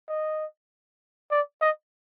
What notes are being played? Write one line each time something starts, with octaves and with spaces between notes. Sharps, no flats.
D#5
D5
D#5